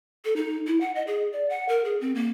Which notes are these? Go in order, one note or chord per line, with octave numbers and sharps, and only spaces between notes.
A4
D#4
E4
F#5
D#5
G#4
D5
F#5
A#4
G#4
C4
A#3